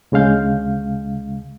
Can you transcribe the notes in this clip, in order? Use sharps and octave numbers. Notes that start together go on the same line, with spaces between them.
D2 C#3 G#3 F5 G6